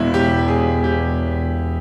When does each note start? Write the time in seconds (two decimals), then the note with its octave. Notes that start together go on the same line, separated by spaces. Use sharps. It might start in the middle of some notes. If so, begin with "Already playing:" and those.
Already playing: E2 G#3 B3 E4
0.14 G4
0.48 G#4
0.84 G4